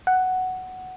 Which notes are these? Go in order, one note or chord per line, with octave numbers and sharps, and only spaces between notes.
F#5